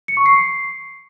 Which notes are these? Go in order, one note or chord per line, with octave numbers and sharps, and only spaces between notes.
C#7
C#6
C7